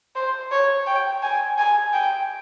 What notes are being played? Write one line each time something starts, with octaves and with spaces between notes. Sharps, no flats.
C5
C#5
G5
G#5
G#5
G5